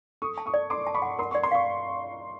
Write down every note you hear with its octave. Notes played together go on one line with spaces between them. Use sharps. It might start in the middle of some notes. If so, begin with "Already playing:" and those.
A4 C#6 D#6
A5
C#6 D#6
D5
A4 C6 D6
A5
B5 C#6
F#5
A#4 C6
D5 C#6
C6
F5 C#6